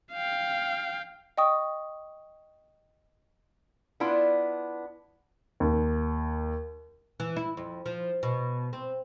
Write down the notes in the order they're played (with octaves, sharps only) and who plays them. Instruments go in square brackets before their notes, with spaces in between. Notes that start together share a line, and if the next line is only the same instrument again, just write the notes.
[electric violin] F5 G5
[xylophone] D#5 G5 C#6 D#6
[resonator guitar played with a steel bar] B3 D4 E4 F4
[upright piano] D#2
[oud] E3
E4
F2
F3
B2
C4